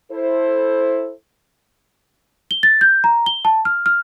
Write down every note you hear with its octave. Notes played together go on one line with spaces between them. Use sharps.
E4 A4 C5
G7
A6
G6
A#5
G7
A5
F6
F6